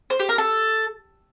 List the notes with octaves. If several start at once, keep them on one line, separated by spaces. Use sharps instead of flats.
C5
G4
A#4
A4